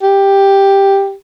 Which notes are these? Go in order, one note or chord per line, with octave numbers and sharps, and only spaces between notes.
G4